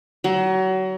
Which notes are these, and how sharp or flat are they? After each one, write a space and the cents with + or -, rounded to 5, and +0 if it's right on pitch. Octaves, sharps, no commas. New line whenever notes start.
F#3 +30